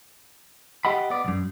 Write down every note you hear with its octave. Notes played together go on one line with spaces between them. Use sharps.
G4 D#5 F#5 B5
B3 D5
B1 F#2